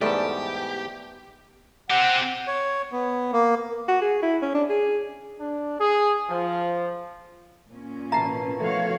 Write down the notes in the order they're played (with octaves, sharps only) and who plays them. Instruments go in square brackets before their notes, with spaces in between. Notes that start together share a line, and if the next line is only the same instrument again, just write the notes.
[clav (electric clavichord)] E2 G#2 G3 [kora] A3 B3 [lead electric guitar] G4 [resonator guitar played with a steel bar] D5 A5
[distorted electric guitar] C4 G4 [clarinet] F#5
[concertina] C#5
B3
A#3
[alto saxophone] F#4
G#4
E4
C#4
D4
G#4
[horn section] D4
G#4
F3
[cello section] A#2 C#4
[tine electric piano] A1 A5 C7 [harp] B2 A#3 E4 [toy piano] E5 A#5
[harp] F3 A4 [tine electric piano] A3 [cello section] F#4 C#5 F5